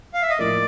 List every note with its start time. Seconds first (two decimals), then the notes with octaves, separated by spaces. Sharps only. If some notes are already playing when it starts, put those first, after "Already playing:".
0.14 F5
0.22 E5
0.30 D#5
0.39 A2 F3 A#3 D5